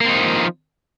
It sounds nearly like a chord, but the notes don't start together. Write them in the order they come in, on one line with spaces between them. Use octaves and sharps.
A#3 C4 D#4 F3